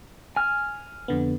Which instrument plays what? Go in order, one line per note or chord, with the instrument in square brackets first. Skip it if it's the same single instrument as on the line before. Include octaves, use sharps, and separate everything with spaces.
[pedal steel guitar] G#5 F6
[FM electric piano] F2 D3 B3